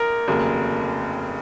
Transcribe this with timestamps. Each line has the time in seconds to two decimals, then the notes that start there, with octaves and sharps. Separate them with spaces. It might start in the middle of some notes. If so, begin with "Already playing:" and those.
Already playing: A#1 A#4
0.28 F1 D#2 C#3 F#3